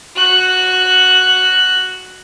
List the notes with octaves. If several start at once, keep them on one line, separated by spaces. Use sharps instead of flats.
F#4 F#6